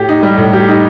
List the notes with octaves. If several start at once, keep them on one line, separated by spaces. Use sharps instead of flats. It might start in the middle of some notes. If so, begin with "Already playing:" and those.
Already playing: A2 G4
D#4
G3
A2
G4
D#4